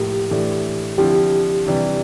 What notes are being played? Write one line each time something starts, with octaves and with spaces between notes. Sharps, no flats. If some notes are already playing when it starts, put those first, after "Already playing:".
Already playing: A2 F3 A#3 G4
A2 E3 A3 D4
D3 F3 C4 E4 G4
C3 E3 G3 D4